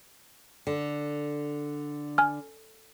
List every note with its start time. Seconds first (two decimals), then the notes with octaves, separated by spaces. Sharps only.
0.67 D3
2.18 G#5 F6